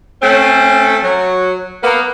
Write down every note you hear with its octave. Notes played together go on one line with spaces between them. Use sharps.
A3 C4 C#4
F#3
A#3 B3